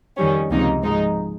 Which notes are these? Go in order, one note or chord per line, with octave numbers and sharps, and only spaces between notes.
F2 D#3 G3 C#4
C#2 C3 F3 A#3 D#4
G#2 F3 G#3 D#4